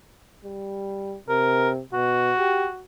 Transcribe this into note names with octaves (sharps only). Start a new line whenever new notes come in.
G3
C3 A#4
B2 F#4
G4